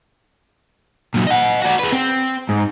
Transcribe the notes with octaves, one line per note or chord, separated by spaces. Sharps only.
A#2 F#3
D#5 F#5
F#4 D5
G#4 B4
C4
G#2